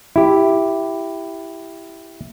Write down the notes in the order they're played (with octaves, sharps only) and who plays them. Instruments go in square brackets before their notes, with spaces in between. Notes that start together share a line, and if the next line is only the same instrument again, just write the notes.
[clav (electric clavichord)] E4 G4